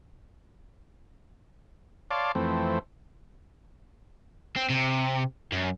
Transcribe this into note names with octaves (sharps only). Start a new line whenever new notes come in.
C#5 D5 F5 A5 C6 D6
F2 E3 A3 C4
C4
C3
F#2